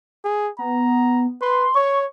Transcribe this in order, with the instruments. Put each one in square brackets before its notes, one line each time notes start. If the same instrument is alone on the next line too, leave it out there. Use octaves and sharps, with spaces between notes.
[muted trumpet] G#4
[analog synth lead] B3 [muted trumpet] A#5
[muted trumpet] B4 [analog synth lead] C6
[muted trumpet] C#5 [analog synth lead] C#6